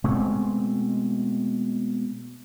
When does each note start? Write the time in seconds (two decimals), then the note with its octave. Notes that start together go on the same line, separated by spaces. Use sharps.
0.04 B2 G#3 A3 C4